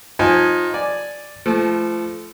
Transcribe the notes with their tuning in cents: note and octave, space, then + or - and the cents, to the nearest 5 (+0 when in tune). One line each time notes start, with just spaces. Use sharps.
F3 +20 D#4 +0 G#5 +0
D5 +0 G#5 +0
F3 -30 A3 -20